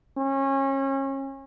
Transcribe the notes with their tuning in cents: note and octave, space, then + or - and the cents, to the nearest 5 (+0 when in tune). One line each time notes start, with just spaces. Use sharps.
C#4 -30